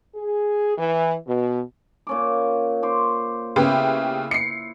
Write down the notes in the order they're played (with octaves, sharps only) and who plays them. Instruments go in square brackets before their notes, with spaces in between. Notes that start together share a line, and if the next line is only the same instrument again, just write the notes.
[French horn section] G#4
E3
B2
[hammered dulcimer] A#2 C#4 D6
C5 C#6 D6
[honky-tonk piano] C#3 B3 G4 [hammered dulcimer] E4
[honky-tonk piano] C7 C#7